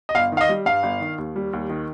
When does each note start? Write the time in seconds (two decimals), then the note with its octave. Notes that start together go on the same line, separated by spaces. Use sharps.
0.09 D#5
0.15 G1 F5
0.32 D#3
0.37 F5
0.41 D#5
0.49 G3
0.66 G2 F5
0.83 G1
1.01 D#3
1.18 D#2
1.36 G3
1.53 D#2
1.69 D#3